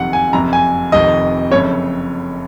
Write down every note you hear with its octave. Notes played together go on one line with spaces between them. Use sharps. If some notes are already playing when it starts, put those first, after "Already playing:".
Already playing: F#1 F2 C3 D#3 F#5
G#5
F#1 F2 C3 A#5
G#5
F1 F2 C3 D#3 D#5
F#1 F2 C#3 C#5